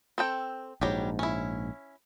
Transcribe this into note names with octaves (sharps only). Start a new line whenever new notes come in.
C4 A4 G5
A#1 G#2 F#3 G3 G4
C#4 E4